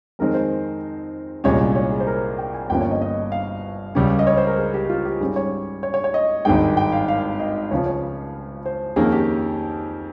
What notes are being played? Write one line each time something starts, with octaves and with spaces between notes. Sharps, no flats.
F2 D#3 G#3 C4 A#4
C5
C2 A#2 G#3 C#4 C#5
C#5
G#4
C5
A#4
G5
G#5
G1 G2 F3 A#3 C#4 G5
C#5
D#5
D#5
F5
C#2 C#3 G3 C#4
D#5
C#5
C5
A#4
G#4
G4
F4
G4
G#2 G3 C#4 G#4
C#5
C#5
C#5
C#5
D#5
G#1 G2 D#3 G#3 G5
G5
F5
F5
D#5
C#2 C#3 F3 C#5
C#5
C5
F2 D#3 A#3 C#4 G#4
G4